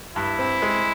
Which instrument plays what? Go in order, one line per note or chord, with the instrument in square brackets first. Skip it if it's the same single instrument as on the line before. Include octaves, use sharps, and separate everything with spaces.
[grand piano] G2 [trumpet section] E4
[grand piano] C4
G#3